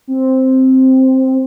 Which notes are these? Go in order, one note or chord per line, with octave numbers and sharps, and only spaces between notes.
C4